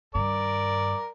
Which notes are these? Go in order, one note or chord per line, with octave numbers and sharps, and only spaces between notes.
G2 D#3 A#4 D5